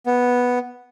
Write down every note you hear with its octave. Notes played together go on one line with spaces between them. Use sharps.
B3